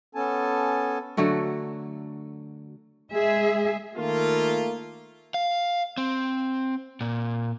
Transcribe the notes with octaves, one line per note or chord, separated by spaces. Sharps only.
B3 C#4 A4 G#5 A5
D3 F#3 A3 F#4
G#3 G#4 E5
D#3 A3 A#3 F4
F5
C4
A#2